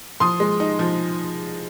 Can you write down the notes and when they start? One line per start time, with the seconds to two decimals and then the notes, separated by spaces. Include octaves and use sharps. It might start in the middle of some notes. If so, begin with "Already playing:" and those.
0.20 F3 C6 D#6
0.40 G#3
0.60 D#4
0.79 F3